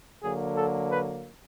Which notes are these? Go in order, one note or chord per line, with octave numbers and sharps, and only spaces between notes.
D3 F#3 A#3 G#4
A4
B4